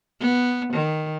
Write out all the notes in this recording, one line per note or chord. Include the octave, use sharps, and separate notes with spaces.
B3
D#3